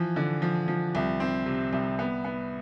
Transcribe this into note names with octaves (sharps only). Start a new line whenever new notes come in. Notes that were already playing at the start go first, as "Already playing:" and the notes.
Already playing: E3 F3
D3
F3
F3
C2
C4
C3
C2
B3
B3